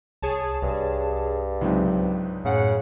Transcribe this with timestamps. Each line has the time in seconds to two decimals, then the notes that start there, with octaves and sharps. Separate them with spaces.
0.22 C2 G#4 C#5 A5
0.62 C2 G2
1.61 C#2 G#2 C3 F#3
2.45 F#2 A2 C#3 F#5 C#7